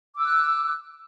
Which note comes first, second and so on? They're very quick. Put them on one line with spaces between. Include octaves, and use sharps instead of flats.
D6 E6 F#6